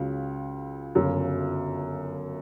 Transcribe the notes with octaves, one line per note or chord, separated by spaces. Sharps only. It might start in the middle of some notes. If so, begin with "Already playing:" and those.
Already playing: C#2 C#3 F#3
G1 F#2 C#3